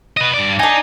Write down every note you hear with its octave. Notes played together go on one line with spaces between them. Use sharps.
B4 D#5
G2 D5
D4 D#4 G#5